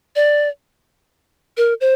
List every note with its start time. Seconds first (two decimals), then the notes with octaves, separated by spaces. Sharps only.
0.16 D5
1.57 A#4
1.81 C5